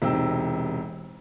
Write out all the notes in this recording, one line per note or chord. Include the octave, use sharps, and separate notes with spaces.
E1 C3 D#4 G5 E6